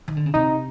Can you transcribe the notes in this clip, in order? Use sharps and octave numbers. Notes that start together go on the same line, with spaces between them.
D#3
D3
C#3
C3 D#4